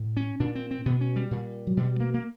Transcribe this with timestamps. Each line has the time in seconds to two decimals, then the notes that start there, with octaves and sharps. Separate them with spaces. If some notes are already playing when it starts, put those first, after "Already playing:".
Already playing: A2
0.17 C#4
0.40 A#2 D4
0.55 C4
0.71 C4
0.86 B2 B3
1.01 C#4
1.16 G3
1.31 A#2
1.67 F#3
1.77 B2 G3
2.00 A#3
2.14 A#3